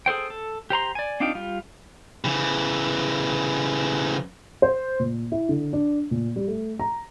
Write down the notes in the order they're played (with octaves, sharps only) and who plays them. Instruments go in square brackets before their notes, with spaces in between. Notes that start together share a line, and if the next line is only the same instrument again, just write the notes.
[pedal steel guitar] G#4 A4 C5 G5
A4
G4 C5 A#5 C6
D5 G#5
C4 D4 D#4 F4 G5
G3 F4
[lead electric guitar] C#3 E3
[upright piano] C5
A#2
E4
D3
D4
A#2
G3
A3
A#5